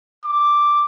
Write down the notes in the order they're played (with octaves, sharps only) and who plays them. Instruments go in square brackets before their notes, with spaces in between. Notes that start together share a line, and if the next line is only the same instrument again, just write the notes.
[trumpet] D6